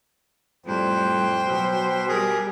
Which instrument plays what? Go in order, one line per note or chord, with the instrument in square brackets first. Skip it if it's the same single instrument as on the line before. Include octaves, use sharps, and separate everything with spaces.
[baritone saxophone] F2 [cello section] A2 G3 [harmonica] C5 G5
[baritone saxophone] B2 [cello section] F#3
[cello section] G3 G4 [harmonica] G#4 A#4